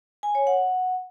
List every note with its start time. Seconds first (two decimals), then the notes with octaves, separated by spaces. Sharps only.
0.23 G#5
0.35 C#5
0.47 F#5